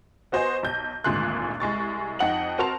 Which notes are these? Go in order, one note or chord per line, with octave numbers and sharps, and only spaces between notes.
B3 F#4 C5 D#5 G#5
B1 G6
G#1 D2 A#2 G#3 C6 F#6
C2 G#3 C#6 A6
F2 D#4 D#5 F#5 G5 F#7
C4 F#4 A#4 A5 C6 F7